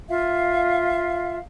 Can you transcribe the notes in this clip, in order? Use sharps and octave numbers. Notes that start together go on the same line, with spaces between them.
F4 E5 F5